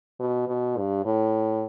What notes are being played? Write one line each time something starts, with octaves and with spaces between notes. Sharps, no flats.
B2
B2
G2
A2